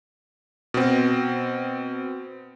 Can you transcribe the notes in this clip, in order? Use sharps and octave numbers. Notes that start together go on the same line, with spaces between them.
B2 C4